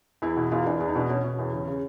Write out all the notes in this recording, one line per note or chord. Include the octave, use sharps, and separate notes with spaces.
E2 E4
B2
E2 F4
E2 D4
E2 D4
D#4
B2 D4
B2 C#4
B2
E2
C#3
C#3